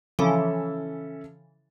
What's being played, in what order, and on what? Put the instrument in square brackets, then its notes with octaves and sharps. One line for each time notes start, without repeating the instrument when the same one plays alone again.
[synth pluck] C#3 E3 F3 [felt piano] C#4 A4 E5